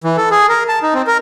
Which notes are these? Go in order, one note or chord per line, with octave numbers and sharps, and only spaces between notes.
E3
A4
G#4
A#4
A5
D#4
C4
A#4